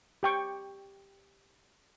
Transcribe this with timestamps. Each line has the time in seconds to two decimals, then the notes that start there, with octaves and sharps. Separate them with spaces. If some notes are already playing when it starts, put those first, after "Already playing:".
0.23 G4 G5 C#6